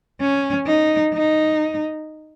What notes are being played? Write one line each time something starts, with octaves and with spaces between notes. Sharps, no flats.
C#4
D#4
D#4